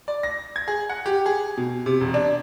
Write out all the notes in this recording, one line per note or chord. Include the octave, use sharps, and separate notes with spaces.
D5
A#6
G#6
G#4
F#5
G4
G#4
B2
C3
E1
D4